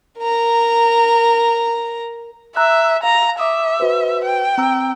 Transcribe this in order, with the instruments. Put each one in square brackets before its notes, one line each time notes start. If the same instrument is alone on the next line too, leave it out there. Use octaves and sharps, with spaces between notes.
[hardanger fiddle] A#4 A#5
[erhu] E5 [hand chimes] A#5 E6 F#6
[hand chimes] F5 [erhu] A#5
[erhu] E5 [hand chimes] D6 D#6
[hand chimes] F#4 B4 C5
[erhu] G5
[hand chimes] C4 A#5 E6